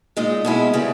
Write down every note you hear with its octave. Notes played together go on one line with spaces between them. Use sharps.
A#2 G#3 D#4
B2 G#3 C#4 E4
C#3 G3 B3